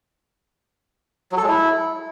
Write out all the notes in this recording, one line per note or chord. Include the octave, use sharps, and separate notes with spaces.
F#3
A4
G#3
E4